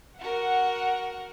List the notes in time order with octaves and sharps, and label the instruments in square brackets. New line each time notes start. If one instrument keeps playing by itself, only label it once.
[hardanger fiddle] F#4 A#4 [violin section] F#5